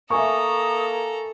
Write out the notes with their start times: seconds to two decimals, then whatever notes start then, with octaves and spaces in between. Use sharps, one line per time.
0.10 A#3 A4 E5 G#5 A#5 C#6 D#6